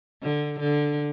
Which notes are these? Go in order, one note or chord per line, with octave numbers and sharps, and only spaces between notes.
D3
D3